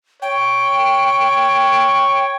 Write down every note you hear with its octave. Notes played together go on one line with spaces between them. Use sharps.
C#5 G5